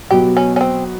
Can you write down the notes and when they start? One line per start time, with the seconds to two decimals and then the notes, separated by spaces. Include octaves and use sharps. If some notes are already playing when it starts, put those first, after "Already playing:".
0.10 B2 F#3 B3 G4
0.37 C#4
0.56 C#4
0.61 C4